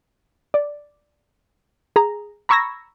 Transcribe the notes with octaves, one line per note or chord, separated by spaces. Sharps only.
D5
G#4 A#5
A#5 B5 C#6 E6 G#6 A#6